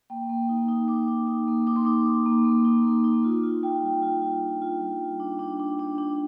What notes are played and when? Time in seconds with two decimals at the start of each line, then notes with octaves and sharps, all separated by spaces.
0.10 A#3 G5
0.29 A#3
0.49 D#4
0.68 D#4
0.88 D#4 D6
1.08 D#4
1.27 D#4
1.47 A#3
1.67 D#4 D6
1.76 C6
1.85 D#4 D6
2.06 D#4
2.26 A#3
2.45 A#3
2.65 D#4
2.85 A#3
3.04 D#4
3.24 F4
3.43 F4
3.63 F4 G5
3.83 G3
4.02 F4 G5
4.22 F4
4.42 D4
4.62 F4
4.81 G3
5.01 G3
5.20 D4
5.39 D4
5.60 D4
5.79 D4
5.98 D4